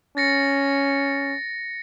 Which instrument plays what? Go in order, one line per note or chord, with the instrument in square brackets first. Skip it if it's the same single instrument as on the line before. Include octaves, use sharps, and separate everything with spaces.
[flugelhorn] C#4 [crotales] A6 A#6 C#7